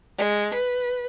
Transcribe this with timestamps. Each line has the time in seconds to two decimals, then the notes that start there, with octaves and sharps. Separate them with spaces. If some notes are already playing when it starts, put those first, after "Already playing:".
0.17 G#3
0.53 B4